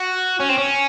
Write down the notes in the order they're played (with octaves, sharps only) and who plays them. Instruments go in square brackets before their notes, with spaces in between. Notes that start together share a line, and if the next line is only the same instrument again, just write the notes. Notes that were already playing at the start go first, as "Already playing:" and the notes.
Already playing: [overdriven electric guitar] F#4
C#4
C4
C#4